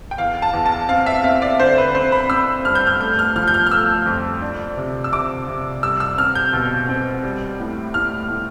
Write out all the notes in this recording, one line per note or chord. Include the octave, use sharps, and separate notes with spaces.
G5
E2 F5
A5
E2
A5
C4 F5
E5
C4 F5
D5
D3 C5
B4
C4 C5
B5
C4 E6
G2 F6
G6
F6
A3 G6
F6
F3 F6
G6
F6
F6
A3 E6
F2
D4
C3
E6
C3 D6
C3
G3 E6
E6
C4 F6
G6
B2
C4
G3
A2
A2 F6
A2